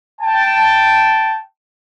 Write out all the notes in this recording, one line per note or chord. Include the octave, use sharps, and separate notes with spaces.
G5 A5